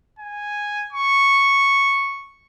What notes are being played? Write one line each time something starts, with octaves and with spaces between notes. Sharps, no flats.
G#5
C#6